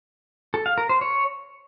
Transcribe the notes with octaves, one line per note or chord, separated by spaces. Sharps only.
A4
F5
A#4
C5
C#5